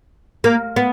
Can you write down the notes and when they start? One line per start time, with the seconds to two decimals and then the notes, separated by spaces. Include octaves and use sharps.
0.44 A#3
0.76 B3